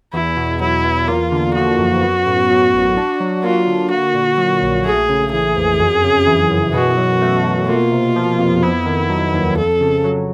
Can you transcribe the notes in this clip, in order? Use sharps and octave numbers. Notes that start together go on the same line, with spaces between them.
E2 E4
B2
F#3 E4
E2
A#3 F4
D3
F3 F#4
F#2
B3
A2
F#3
A1
D4
F#3
A#3 F4
D3
A#3 F#4
A#2
F#3
A#1
A3 G#4
C#3
E3 G#4
F2
F#2
C#3
E3
F#2
B2 F#4
F#3
A3
B2
A#3 F4
C3
F3
F2
B3 E4
D#3
F#3
D#2
F2 A4
C#3
F#3